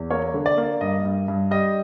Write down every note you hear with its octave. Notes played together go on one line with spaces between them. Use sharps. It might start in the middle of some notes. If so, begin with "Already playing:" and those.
Already playing: E2
A#3 C#5
D3
D5
A#3
G2 D#5
G2
G2
G3 D#5